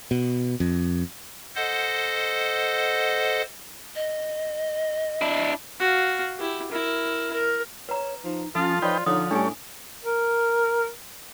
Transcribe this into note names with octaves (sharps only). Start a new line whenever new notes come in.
B2
F2
A4 C5 D#5 F#5
D#5
D4 E4
F#4 F5
E4 G4
E4 A#4
A#4
B4 C#5 A#5
F3 D#4
F3 C#4 F4 A4 A5
F3 D#4 B4 C#5 D5 G5 C6
D3 F3 D#4 C#5 D#6
A2 G3 A3 C#4 D4 G#4 G#5
A#4